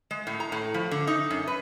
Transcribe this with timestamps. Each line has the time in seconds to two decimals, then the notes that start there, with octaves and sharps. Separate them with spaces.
0.11 G#3
0.27 A2
0.40 A#5
0.52 A2
0.74 F3
0.91 D3
1.07 D#4
1.31 F#2
1.47 B4